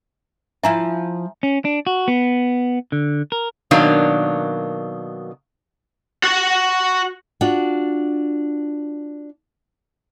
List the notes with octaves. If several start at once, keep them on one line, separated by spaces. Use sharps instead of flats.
F3 E4 F4 E5 G#5 A#5
C#4
D4
F#4
B3
D3
A#4
B2 D#3 F#3 A#3 D4 F5
F#4 F#5
D4 F4 F#4